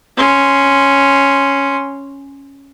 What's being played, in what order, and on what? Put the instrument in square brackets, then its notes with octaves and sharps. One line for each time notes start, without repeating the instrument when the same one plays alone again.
[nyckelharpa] C#4 C6